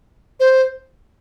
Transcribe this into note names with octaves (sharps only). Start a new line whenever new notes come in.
C5